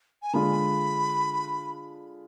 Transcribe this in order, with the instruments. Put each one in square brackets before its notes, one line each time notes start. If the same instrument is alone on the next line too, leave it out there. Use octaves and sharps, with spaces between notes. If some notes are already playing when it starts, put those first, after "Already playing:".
[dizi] G#5
[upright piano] D3 G#3 D4 F4 [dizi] B5